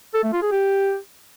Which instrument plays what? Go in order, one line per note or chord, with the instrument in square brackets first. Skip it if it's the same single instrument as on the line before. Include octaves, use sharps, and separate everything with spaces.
[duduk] A4
A3
F4
G#4
G4